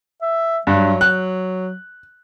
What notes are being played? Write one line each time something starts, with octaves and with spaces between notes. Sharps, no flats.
E5
G2 F#3
F#6